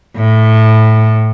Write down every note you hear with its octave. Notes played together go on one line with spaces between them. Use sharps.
A2